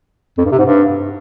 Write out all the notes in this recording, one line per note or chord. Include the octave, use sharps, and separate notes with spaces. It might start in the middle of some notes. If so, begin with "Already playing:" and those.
F2
G2
C3
G#2
G2